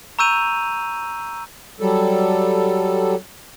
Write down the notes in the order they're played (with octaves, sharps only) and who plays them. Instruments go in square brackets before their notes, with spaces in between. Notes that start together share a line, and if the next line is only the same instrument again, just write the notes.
[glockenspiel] A#5 C#6 E6 G6 D#7 F7
[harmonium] F#3 G3 A4